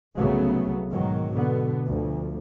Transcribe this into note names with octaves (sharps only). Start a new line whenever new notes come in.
C2 C#3 F#3 A3 B3
G#2 B2 D#3 F#3
B2 D3 B3
D2 F3